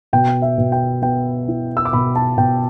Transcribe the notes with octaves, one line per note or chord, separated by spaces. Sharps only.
B2 G5
E5
B2
G5
B3 G5
E4
E6
D6
B2 B5
A5
B2 G5